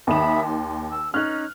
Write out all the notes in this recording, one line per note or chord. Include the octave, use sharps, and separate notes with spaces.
D#2 D#3 E5 B5 D#6 E7
C6
E6
C#4 D#4 F6 F#6